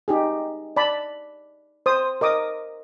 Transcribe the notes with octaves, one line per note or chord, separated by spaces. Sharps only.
D#4 G4 G#4
D5 A5 B5
C5 D#6
A#4 D#5 D6 D#6